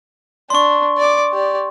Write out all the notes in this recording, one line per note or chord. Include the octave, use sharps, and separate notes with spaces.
D4 C6 C#6
D5 D6
G4 D5